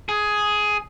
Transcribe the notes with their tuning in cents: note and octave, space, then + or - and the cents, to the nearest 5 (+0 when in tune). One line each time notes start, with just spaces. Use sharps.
G#4 +10